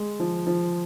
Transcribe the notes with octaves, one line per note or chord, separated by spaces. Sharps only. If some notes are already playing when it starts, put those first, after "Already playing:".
Already playing: G#3
F3
F3